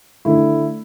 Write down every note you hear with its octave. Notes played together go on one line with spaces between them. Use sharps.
D3 A3 E4